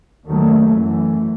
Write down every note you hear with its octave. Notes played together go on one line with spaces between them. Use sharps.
D#2 D#3 F#3 A3
F#2 E3 A3